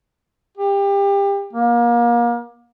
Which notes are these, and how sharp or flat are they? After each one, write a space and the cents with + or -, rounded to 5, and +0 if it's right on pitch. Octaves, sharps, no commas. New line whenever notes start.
G4 +25
A#3 +30